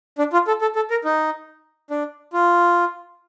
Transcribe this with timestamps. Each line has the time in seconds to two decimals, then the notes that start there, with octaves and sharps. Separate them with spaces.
0.18 D4
0.33 F4
0.47 A4
0.62 A4
0.76 A4
0.90 A#4
1.04 D#4
1.90 D4
2.33 F4